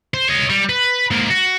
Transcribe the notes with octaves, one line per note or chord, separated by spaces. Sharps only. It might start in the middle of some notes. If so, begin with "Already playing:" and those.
C5
C#5 D#5
G3
B4
G#2 A#3
F#4